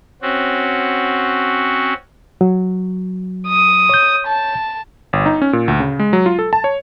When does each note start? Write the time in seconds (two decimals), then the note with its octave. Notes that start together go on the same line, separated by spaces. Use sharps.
0.22 C4 C#4 F#4
2.41 F#3
3.48 D#6
3.89 C#5 G6
4.27 A5
5.13 G1
5.26 D#4
5.42 C#4
5.53 A#2
5.68 D2
5.80 C#3
5.99 G#3
6.13 F#3
6.26 F4
6.39 A4
6.53 A5
6.64 C#5